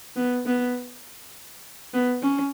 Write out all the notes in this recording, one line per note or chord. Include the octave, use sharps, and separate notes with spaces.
B3
B3
B3
C#4